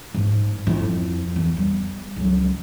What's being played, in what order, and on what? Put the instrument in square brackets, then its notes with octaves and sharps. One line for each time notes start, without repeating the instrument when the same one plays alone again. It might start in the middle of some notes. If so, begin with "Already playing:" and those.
[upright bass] G#2 G#3
F2 E4
E2
G3
C#2 F#3